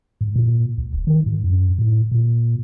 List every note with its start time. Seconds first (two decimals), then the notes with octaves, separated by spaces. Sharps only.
0.21 G#2
0.36 A#2
0.78 C#2
0.94 D#1
1.07 D#3
1.26 G#2
1.44 F#2
1.78 A2
2.11 A#2